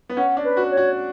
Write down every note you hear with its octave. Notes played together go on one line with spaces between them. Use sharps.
B3
C#4 F#5
D4
B4
F#4
C#5
F#4